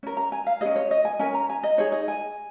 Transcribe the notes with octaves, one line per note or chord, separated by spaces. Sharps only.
C#4 A#4
A#5
G#5
F5
C#4 G#4 D#5
C#5
D#5
G#5
C#4 A#4 G#5
A#5
G#5
D#5
D#4 G#4 C#5
D#5
G#5